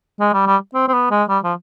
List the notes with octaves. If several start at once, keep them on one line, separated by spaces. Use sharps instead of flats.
G#3
G3
G3
C4
C4
B3
G#3
G3
F3